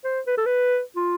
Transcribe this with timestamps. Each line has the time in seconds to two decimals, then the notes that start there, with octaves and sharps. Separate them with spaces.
0.04 C5
0.27 B4
0.37 A4
0.46 B4
0.96 F4